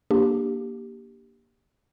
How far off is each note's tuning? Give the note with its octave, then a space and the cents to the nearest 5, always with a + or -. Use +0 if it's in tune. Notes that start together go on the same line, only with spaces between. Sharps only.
A#3 +15 D4 +0 G4 +0